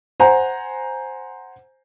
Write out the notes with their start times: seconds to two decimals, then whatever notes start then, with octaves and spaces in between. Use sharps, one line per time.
0.20 C5 F#5 G#5 A#5